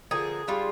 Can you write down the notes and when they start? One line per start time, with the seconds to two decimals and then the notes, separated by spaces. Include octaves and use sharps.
0.11 D3 F3 A#3 G#4
0.48 G3 D4 F4